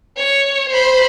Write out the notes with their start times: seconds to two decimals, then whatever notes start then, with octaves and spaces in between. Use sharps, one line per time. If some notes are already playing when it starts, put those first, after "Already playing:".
0.17 C#5
0.69 C5 B5